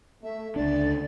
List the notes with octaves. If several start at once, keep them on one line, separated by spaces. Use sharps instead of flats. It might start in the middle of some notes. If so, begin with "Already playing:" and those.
A3 E5
C#2 D3 D4 D5